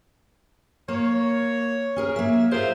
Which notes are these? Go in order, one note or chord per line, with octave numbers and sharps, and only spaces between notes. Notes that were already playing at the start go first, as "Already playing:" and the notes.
A#3 C#5
C#4 G#4 A#4
A#3 E5
F4 G#4 A#4 C5 E5